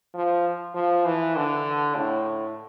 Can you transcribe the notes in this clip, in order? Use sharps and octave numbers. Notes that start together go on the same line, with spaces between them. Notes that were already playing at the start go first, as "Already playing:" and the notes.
F3
F3
E3
D3
A2